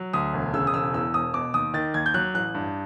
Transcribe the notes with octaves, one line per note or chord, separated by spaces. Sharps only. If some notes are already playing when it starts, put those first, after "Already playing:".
Already playing: F#3
D2 D#6
E1
C#3 E6
D#6
E1 E6
E2 E6
E1 D#6
B2 D6
D#2 D#6
D#3 A6
D#2 G#6
G6
F#3 F#6
A1 F#6
G2